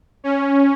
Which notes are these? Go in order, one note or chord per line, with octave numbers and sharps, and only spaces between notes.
C#4